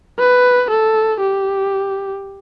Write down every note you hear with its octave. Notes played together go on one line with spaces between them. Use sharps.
B4
A4
G4